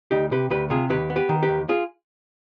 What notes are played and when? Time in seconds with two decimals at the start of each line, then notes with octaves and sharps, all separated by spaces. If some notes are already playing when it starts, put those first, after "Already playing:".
0.11 D2 D#4 G4
0.31 C3 G4 B4
0.50 D2 G4 B4
0.70 C3 F4 G#4
0.90 D#2 G4 B4
1.10 B3
1.16 G4 B4
1.29 D#3
1.42 G4 B4
1.49 D#2
1.69 F4 G#4